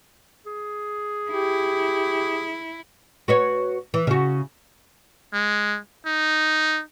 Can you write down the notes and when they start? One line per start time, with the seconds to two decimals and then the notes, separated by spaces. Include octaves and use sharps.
0.46 G#4
1.31 E4 G4
3.28 F#4 B4 C#5
3.94 E3
4.07 C#3 F#4
5.33 G#3
6.06 D#4